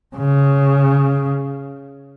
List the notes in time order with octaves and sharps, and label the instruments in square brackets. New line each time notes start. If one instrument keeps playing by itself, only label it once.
[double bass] C#3